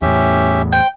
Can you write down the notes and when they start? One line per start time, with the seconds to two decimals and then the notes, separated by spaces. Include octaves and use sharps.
0.02 E2 A2 C#4 G4 E5
0.73 C5 G5